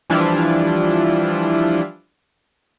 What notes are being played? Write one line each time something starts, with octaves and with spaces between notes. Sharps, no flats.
E3 F3 G3 D4 E4 F4